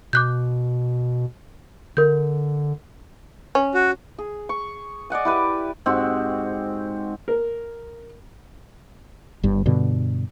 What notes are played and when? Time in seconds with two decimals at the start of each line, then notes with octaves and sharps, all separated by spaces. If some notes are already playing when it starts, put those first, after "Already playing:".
0.13 B2 D6 F#6 G6
1.97 D3 A#4 G6
3.55 C#4
3.74 F#4
4.18 G#4
4.49 C#6
5.10 D5 D#5 F#5 G#5
5.25 E4 G4 B4
5.86 G#2 C4 F#4 G4
7.28 A#4
9.43 G1 G2
9.66 G2 B2 D3